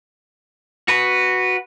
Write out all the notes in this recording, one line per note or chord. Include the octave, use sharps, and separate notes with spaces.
F#4 B4